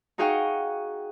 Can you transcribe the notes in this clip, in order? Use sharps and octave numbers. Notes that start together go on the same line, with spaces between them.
D#4 F#4 G#4 F5 G5 C#6